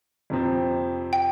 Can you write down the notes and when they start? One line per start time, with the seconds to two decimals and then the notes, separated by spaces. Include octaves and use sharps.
0.30 F2 C3 F3 C4
1.13 G5